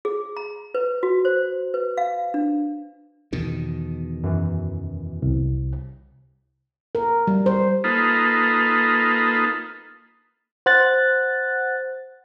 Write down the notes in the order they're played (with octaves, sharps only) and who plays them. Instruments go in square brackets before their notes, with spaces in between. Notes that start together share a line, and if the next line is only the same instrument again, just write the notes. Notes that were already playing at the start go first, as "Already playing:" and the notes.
[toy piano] G#4
A#5
B4
F#4
C5
B4
F5
D4
[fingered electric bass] E2 B2 D#3
[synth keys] F#2 E3
[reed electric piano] C2
[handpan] A#4
G3
C5
[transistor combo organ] A#3 D#4 F4 A4 B4
[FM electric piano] C5 F#5 F#6 A6